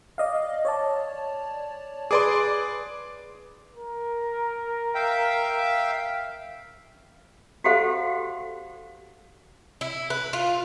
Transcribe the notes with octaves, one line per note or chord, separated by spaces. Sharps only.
D5 D#5 F5
C#5 D5 A5
G#4 B4 D5 C6 D6
A#4
E5 F5 G5
F#4 G4 A4 C5 F5 F#5
E4
B4
F4